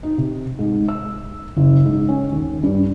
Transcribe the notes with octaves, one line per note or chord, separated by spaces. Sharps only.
D#4
C3
G#2
E6
F#1
G#2
C#4
D#2
G2